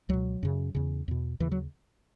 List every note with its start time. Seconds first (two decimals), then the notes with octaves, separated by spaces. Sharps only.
0.09 C#2 B2 F#3
0.43 F#2 C#3
0.75 E2 C#3
1.08 E2 B2
1.40 D#2 C#3 E3
1.52 F#3